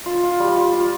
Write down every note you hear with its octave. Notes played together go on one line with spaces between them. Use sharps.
F4
F4
G3
F4
F4